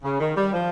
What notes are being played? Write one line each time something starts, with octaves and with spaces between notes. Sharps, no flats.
C#3
D#3
G3
F3